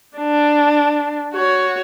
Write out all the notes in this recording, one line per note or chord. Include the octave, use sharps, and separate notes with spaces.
D4
F#4 C#5